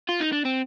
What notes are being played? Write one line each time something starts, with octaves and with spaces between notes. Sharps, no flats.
F4
D#4
D4
C4